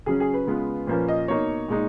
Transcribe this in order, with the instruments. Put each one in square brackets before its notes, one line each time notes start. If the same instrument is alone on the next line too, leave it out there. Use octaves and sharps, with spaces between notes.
[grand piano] C#3 F#3 C#4 G#4
G#4
B4
C#3 G#3 B3 F4
A#2 F3 A#3 C#4 B4
D#5
B2 A#3 D#4 C#5
A#2 G#3 D#4